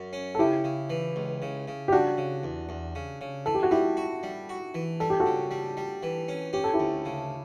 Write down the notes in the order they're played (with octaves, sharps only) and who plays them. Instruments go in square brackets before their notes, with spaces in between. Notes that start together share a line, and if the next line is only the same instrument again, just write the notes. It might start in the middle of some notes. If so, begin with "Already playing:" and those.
Already playing: [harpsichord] F#2
C#4
[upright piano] A4
[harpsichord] C#3 [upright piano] E4 G4
[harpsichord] C#3
E3
C#2
C#3
C#3
[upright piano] G4
[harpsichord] G3 [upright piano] D4 F#4
[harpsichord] C#3
E2
E2
C#3
C#3
[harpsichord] E3 [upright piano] A4
[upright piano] G4
F#4
[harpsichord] G3 [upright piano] E4 G4
[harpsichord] F#4
G3
F#4
E3
[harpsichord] G3 [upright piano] A4
[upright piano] G4
F#4 A4
[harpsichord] C#3
G3
G3
E3
C#4
[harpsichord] C#4 [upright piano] G4
[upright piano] A4
E4 G4
[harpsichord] D2
C#3